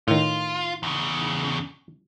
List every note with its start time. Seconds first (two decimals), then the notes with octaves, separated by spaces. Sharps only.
0.08 A2 D#3 F4
0.83 E2 C#3